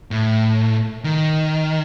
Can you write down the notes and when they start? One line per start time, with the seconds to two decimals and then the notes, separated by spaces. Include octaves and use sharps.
0.11 A2
1.04 D#3